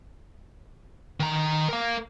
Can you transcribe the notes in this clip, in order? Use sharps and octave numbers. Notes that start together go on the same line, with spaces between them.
D#3 A#5
A#4 F5